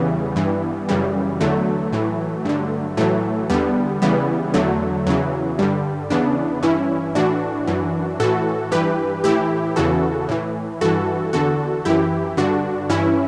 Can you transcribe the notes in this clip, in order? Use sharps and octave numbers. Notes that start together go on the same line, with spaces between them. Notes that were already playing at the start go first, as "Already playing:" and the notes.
Already playing: E2 C#3 E3 G3 B3
G2 E3
F#2 C#3 E3 G3
E2 D3 F#3 A3
A2 E3
G2 D3
A2 E3 F#3 A3
E2 D3 G3 B3
E2 C#3 E3 G3 B3
E2 D3 F#3 A3
E2 C#3 E3 F#3
G2 D3 G3
E2 C#3 E3 B3 D4
G2 E3 C#4 E4
A2 E3 D4 F#4
F#2 E3
A2 E3 F#4 A4
G2 E3 G4 B4
A2 E3 E4 G4
E2 C#3 E3 F#4 A4
A2 E3
G2 E3 F#4 A4
E2 D3 F#4 A4
F#2 E3 E4 G4
G2 D3 D4 F#4
G2 E3 C#4 E4